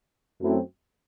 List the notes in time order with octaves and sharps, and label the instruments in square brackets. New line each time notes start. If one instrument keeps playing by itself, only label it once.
[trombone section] F#2 F#3 A3 C4 E4